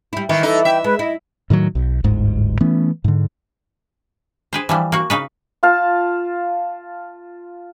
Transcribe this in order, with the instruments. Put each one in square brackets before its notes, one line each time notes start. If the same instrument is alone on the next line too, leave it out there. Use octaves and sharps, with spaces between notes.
[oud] G3 E4
[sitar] D#3 [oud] E3 [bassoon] E4
[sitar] D#4 [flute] A4
[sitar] E5 [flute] G5
[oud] G#3 [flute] B4
[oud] E4 [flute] D#5
[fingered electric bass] A2 D#3 E3 F#3
B1
D1 G1 G#2
E3 A3 B3 C#4
G#2 D3
[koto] G#4 B4 C5
E3 F3 G3
A#3 F#4
C#3 D#4 B4
[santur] F4 F5 A5